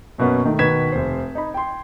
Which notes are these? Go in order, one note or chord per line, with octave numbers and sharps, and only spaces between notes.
F#2 B2 A#3 B3 C#4
D#3 A3
B2 D#3 B4 G#6 B6 E7
F1 C5
D#4 B5
G5 C6